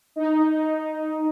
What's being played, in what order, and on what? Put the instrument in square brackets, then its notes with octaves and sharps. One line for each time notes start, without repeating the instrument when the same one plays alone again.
[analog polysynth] D#4